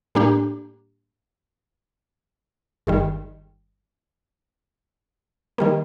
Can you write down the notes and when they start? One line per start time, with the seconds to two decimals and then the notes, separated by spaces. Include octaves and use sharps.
0.15 A2 G3 A#3 D4 G4
2.87 G1 G2 D#3 G3
5.58 D#3 G3 A#3